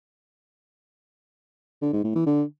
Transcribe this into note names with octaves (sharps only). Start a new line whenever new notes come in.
D3
G#2
A2
E3
D3